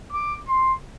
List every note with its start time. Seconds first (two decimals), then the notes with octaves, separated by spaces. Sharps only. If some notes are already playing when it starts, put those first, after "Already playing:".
0.12 D6
0.48 C6